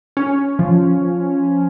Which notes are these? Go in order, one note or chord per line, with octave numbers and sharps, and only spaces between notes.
C#4
F3